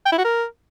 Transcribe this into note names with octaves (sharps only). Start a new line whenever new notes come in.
G5
E4
F#4
A#4